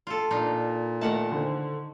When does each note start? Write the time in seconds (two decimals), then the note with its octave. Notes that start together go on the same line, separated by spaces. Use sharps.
0.07 F4 A4
0.31 A#2 D4 D#4 F4
1.01 D#3 A3 D#4 A#4 F#5 A5
1.32 D3 C5